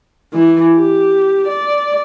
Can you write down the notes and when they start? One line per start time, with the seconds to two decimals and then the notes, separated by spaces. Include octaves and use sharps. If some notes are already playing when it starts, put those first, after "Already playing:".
0.33 E3
0.75 G4
1.47 D5